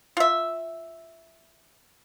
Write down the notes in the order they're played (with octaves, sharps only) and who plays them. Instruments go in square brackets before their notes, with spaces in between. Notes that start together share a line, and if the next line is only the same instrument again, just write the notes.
[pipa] F4 E5